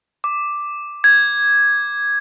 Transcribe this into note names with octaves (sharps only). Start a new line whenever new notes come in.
D6
G#6